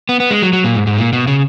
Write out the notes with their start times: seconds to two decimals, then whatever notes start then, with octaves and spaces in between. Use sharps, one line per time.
0.09 B3
0.20 B3
0.31 G#3
0.42 F#3
0.53 F#3
0.64 A#2
0.75 G#2
0.87 G#2
0.98 A#2
1.13 B2
1.27 C#3